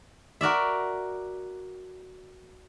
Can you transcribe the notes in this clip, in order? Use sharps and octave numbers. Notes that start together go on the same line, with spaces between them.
F#4 A#4 D5 E5